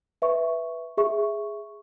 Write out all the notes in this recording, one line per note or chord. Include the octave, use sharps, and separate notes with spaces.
B4 E5 C#6
G#4 E5 C#6